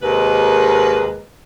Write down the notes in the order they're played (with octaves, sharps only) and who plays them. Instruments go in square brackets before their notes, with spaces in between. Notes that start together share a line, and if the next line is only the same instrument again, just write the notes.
[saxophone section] D#2 C3 G#3 A#4 B4